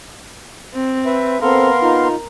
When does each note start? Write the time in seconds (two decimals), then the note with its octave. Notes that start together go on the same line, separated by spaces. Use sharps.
0.74 C4
1.06 B4 E5
1.42 B3 C4 A4 A#4 F5 C6
1.82 D#4 F4